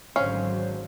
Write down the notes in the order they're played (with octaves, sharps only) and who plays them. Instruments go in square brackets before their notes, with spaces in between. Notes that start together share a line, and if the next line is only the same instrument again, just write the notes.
[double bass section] G#1 D3 F#3 [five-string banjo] C#4 F5 [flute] C5